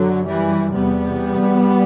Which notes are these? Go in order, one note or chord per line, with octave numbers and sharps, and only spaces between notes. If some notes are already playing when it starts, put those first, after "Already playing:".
Already playing: F#2 D3 F#3
E3 G3
E2 C3 G3 B3